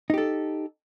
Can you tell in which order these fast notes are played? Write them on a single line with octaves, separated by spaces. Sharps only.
D#4 G4 A4